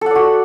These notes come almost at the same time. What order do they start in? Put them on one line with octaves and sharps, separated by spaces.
A4 F#5 D5 F#4